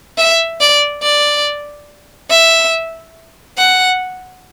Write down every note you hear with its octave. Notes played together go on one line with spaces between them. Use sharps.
E5
D5
D5
E5
F#5